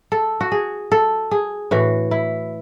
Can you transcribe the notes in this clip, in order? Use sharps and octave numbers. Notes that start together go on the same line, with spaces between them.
A4
F#4
G#4
A4
G#4
A2 E3 F#4
E4